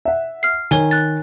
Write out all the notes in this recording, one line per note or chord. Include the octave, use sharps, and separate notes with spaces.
E5 F#5
F6 C7
D#3 C#5 G#5 G7
F#6 A6